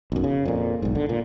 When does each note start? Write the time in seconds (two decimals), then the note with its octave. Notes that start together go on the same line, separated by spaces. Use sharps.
0.12 B1 F#2
0.24 C#3
0.45 F2 A#2
0.82 B1 G#2
0.95 D3
1.09 A#2